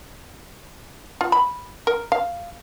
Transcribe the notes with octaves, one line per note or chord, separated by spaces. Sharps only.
F4
B5
A#4
F5